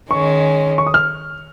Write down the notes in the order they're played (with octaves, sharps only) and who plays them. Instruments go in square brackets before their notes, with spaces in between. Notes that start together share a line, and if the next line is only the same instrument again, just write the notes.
[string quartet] D#3 G#3 C#4 [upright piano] C#6
[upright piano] C#6
D#6
F6